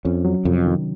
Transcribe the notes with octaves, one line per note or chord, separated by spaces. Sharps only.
F2 C#4
F#3
F2 C3
D#3